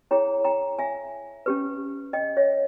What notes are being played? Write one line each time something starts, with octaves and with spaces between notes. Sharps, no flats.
E4 G#4 C#5 G5 A#5
G5 A#5
E5 G#5
C#4 G4 B4
D#5 G5
C#5 E5